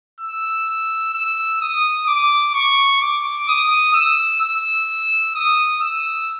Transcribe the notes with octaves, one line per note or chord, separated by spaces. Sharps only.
E6
E6
D#6
D6
C#6
D6
D#6
E6
E6
D#6
E6